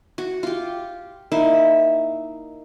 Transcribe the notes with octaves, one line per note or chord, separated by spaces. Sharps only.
F#4
F4 G4
A#3 D#4 E4 E5